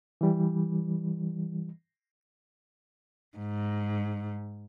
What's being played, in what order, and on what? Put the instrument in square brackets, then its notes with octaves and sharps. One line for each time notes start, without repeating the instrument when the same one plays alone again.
[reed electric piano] E3 G3
[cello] G#2